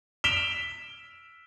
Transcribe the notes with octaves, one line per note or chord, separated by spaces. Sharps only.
B6 D7 E7 F7 G7